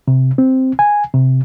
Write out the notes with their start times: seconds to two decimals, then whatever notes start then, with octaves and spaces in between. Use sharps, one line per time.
0.08 C3
0.38 C4
0.79 G#5
1.14 C3